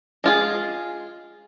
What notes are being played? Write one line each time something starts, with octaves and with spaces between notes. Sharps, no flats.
G#3 F4 G#4